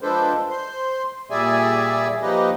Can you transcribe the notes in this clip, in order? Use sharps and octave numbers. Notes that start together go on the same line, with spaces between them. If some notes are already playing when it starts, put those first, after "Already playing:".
F3 G#3 D4 A4 B4 C5
C5 C6
A#2 G3 G#4 D5 E5 G#5
F3 A#3 D#4 G4 B4 D#5